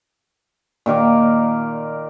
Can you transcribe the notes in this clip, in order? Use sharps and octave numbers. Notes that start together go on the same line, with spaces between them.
A#2 D#3 A#4 D6